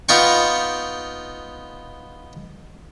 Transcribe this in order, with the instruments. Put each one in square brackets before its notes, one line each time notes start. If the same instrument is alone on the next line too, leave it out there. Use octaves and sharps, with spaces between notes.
[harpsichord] B3 D#4 F4 G5 C#6